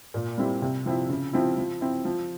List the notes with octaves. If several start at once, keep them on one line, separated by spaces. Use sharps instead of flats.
A#2
G3 C4 E4
C3
F3 C4 E4
C#3
F3 C4 E4
F3
C4 E4
F3